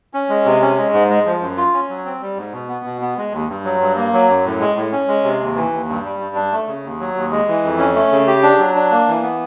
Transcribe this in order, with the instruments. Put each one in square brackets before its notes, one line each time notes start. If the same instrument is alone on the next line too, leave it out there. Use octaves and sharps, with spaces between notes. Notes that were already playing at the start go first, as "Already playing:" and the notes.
[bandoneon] C#4
G#3
C3
C#4
G#3
G#2
G#3
F3
F#2
F4
C#4
F#3
C4
G3
G#2
B2
B3
B2
B3
G#3
D#2
G2
F#3
G2
A#3
F#3
F#2
A2
G#3
A2
C#4
G#3
C3
D#2
E3
D#2
G2
G3
G2
D4
A3
C#3
D#2
F#3
D#2
G#3
E3
F2
C#4
A3
C#3
G4
D4
F#3
D4
A#3
E3
B3